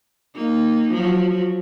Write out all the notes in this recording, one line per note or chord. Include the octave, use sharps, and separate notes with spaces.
A#3 D#4
F3 F#3 F#4